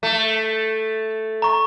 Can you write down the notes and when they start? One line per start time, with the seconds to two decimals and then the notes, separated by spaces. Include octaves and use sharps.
0.03 A3
1.42 A#5 C#6